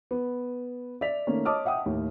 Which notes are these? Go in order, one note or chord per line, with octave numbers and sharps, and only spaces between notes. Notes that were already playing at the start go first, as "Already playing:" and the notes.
B3
D5 E5 B6 F7
D#3 A3 A#3 C#4
C#5 D#5 A5 D6 D#6 F6
E5 F#5 G5 D#6
D#2 A2